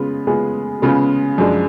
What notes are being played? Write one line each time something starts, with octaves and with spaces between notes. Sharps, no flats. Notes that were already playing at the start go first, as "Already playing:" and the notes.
Already playing: C#3 G#3 B3 F4
C#3 G#3 B3 F4 G#4
C#3 G#3 B3 F4 G#4
F#2 F3 G#3 D4